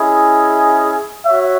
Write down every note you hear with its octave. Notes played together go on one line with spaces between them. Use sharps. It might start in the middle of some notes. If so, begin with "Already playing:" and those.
Already playing: C#4 E4 G#4 D#5
F#4 C#5 E5